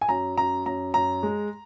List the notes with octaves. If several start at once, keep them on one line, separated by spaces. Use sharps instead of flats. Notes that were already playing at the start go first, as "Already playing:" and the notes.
G#5
F#2 A#5
F#2 A#5
F#2 A#5
F#2 A#5
G#3